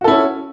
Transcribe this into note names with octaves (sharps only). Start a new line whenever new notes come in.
C#4 E4 F#4 A4